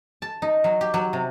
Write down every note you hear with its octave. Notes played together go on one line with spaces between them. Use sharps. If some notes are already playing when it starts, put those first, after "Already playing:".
A5
D#4
F#3
G4
F#3
C3